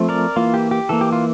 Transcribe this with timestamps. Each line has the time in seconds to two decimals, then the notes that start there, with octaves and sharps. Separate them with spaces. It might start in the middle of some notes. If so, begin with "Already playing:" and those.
Already playing: F3 A3 C4
0.09 A#4 D5
0.36 E3 A#3 F4
0.54 G4
0.71 G4
0.89 E3 A#3 A4
1.01 G4
1.12 F4